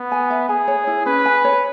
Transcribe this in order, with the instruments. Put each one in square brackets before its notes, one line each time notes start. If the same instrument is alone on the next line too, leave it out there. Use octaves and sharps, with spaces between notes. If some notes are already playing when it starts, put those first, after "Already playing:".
Already playing: [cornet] B3
[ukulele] G#5
E5
[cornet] G#4 [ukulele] G#5
[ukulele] C#5
E4
[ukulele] C#4 [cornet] B4
[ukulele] G#5
C#5